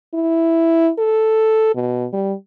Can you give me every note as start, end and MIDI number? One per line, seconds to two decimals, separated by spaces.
0.14 0.91 64
0.99 1.72 69
1.75 2.06 47
2.13 2.34 55